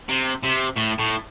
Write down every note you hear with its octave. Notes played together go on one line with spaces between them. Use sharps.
C3
C3
A2
A2